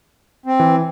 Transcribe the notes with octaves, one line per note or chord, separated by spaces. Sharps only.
C4
E3